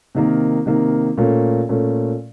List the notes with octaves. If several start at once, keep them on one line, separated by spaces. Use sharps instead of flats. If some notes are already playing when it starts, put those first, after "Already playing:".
C3 D#3 A#3
C3 D#3 A#3
A#2 A3 C#4
A#2 A3 C#4